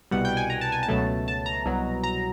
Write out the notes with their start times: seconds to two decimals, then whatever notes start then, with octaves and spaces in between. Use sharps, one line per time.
0.11 C2 B2 G3 F#5
0.25 G5
0.37 G#5
0.50 A#5
0.61 A5
0.72 G#5
0.83 A5
0.89 C#2 B2 F#3 A3
1.28 A5
1.46 A#5
1.66 C2 B2 F#3
2.03 A#5